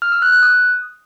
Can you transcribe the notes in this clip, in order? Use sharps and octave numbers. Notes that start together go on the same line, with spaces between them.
F6
E6
F#6
F#6
D#6